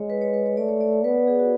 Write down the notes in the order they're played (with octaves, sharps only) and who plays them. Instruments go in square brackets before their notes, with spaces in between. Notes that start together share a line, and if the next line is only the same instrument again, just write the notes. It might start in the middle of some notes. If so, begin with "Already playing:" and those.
Already playing: [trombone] G#3 [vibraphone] C#5
[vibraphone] B4
C#5
B4
C#5
[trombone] A3 [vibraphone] D5
[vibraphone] C#5
D5
C#5
[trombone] B3 [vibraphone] B4
[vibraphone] G#4
F#4